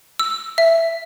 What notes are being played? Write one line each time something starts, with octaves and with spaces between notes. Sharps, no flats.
E6
E5